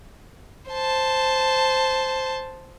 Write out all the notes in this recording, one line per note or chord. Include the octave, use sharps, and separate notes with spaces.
C5 A5